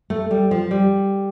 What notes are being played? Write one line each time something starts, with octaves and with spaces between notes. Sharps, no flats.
A3
G3
F3
G3